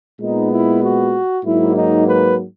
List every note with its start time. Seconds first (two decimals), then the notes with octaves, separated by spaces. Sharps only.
0.20 A#2 G#3 B3 D#4
0.51 E4
0.82 F#4
1.44 G#2 F#3 A#3 E4
1.76 D#4
2.07 B4